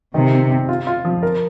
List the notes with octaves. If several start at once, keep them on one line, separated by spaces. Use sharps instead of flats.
C3 D#3
C4
C4
F4
F4
F3
A#4